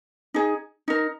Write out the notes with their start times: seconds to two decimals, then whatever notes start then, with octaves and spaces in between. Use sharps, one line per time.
0.34 D#4 G#4
0.88 D#4 A#4